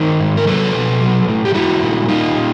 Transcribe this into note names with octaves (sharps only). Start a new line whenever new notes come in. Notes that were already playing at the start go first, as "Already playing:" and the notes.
Already playing: D#3 A#4 C5
G#2
A#4
F#3 A4 B4
B2
F#3
A2
G4
G3 E4 F#4
A#2
G3 D#4 F4
A#2